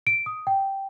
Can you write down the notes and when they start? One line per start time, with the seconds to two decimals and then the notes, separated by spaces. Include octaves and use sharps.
0.07 D7
0.26 D#6
0.47 G5